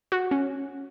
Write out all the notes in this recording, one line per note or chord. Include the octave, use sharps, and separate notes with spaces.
F#4
C#4